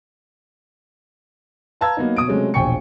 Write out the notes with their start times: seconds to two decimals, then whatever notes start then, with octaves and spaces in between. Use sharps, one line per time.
1.81 B4 F5 A5 A#5 E6 G#6
1.97 F#3 A#3 B3 D#4
2.17 B2 D#6 D7
2.28 C3 F#3 G#3 A3 C#4
2.54 E1 A#1 G5 G#5 C#6 C#7